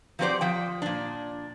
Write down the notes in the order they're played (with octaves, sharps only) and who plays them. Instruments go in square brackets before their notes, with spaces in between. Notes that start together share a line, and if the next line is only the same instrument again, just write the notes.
[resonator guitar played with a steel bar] F3 F#3 C4 G4 C5 D5
F3 G5
A#2 D4